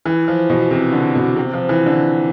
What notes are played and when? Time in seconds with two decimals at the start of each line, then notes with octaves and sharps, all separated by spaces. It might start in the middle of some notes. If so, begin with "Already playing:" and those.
0.06 E3
0.28 F3
0.50 B2
0.71 C3
0.92 D3
1.15 B2
1.36 C3
1.53 F3
1.69 E3
1.86 D3